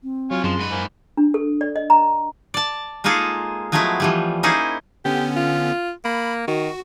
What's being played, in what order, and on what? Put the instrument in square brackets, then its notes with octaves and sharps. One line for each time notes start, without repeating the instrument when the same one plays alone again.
[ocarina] C4
[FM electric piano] F#3 [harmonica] F4 C#5 G#5
[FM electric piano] F#2 [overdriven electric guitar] F3 [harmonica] G#3 C6
[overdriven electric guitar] G#2 B4
[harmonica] A#3 C5 G#5
[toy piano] D4
A4
D5
D#5
A#5
[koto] D5 A5
G#3 A#3 D#4 F4 G#4 A4
F3 F#3 G#3 A3 B3 E4
E3 F3 G3
A#3 C#4 D#4 E4 G#4 C5
[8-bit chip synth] D3 B3 C#4 [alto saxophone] G4
[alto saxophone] F4
[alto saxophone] A#3 [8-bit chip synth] B5
[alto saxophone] D#3 [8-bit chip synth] F#4